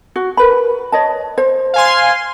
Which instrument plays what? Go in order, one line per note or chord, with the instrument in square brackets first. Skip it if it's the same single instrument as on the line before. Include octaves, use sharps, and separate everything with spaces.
[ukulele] F#4
A#4 B4 B5
C#5 D#5 A5
C5
[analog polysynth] F5 G#5 C6